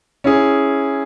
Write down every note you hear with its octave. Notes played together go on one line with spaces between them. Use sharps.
C#4 E4 G#4